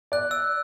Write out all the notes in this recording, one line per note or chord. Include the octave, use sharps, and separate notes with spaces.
D5 F#6
E6